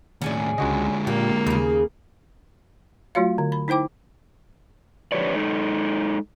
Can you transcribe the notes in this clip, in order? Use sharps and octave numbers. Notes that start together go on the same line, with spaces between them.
D#2 A2 C#4 G#4 D5
C#2 D3 G#3 F#4 D#5
A#2 A#3 G4
D#2 C#3 G#4
F#3 A3 F4 F#4 C#5 F5
D3
B5
D#4 E4 C5 G5 D6
D3 F3 G4 B4 C#5 D5
G#3 D#4 A4